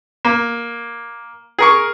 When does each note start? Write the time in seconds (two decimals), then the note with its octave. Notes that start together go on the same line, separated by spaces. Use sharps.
0.25 A#3
1.59 G#4 A#4 C#6